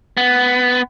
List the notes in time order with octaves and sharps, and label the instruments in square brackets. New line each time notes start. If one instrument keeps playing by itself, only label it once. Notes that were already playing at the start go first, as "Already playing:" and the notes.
[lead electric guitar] B3